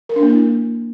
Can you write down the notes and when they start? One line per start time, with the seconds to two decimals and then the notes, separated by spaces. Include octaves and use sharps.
0.09 A#4
0.16 D4
0.23 A#3
0.29 E4